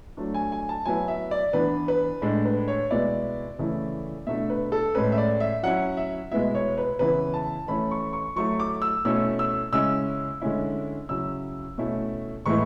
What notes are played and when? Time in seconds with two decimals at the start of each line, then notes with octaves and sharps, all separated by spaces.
0.17 F#3 A3 D4
0.34 G#5
0.52 G#5
0.69 A5
0.86 F#3 B3 E4 G#5
1.08 E5
1.31 D5
1.53 E3 B3 D4 B4
1.88 B4
2.22 A2 G#3 D4
2.45 B4
2.68 C#5
2.91 B2 G#3 B3 E4 D5
3.59 C#3 E3 A3 E4
4.27 B2 A3 D4 E5
4.50 B4
4.72 A4
4.95 A2 G#3 C#4 B4
5.12 E5
5.18 D5
5.40 E5
5.63 F#3 C#4 E4 F#5
5.97 E5
6.32 B2 G#3 B3 E4 E5
6.55 C#5
6.78 B4
6.99 C#3 E3 B3 E4 B4
7.34 A5
7.68 E3 A3 C#4 E4 B5
7.91 C#6
8.13 C#6
8.36 F#3 A3 E4 C#6
8.60 D6
8.82 E6
9.05 B2 A3 C#4 E4 E6
9.39 E6
9.72 C#3 G#3 C#4 E4 E6
10.42 D3 G#3 C#4 E4
11.09 C#3 F#3 C#4 E4 E6
11.78 B2 A3 C#4 E4
12.46 A2 E3 G#3 B3 E4 C#6